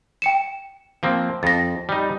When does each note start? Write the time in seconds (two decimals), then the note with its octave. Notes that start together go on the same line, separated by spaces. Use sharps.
0.22 G5 C#7 E7
1.03 F3 A#3 C4
1.43 F2 A6 A#6
1.89 G3 D#4